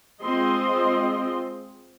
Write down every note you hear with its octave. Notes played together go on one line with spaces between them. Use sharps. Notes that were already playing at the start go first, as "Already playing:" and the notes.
G#3 C4 F4 D#5 C6